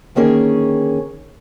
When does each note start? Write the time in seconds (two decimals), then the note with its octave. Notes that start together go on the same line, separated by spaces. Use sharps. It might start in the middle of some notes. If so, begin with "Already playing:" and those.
0.15 D3 D#3 A#3 C#4 G#4 C#5